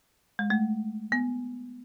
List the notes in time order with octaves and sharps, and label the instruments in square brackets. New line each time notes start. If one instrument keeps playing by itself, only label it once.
[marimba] G#3
A3
B3